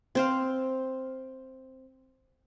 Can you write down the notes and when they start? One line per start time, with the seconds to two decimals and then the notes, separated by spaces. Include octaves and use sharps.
0.15 C4 C5 F5